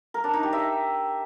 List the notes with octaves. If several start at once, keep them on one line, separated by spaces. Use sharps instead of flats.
A#4
D4
D#4
G4
E5